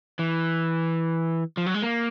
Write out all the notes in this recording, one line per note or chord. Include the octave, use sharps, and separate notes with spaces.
E3
F3
F#3
G#3
A#3